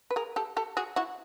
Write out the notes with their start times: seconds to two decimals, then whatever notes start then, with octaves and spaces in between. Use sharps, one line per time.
0.11 B4
0.16 G#4 A#4
0.36 G4 A4
0.57 G4 A4
0.77 F#4 G#4
0.96 E4 F#4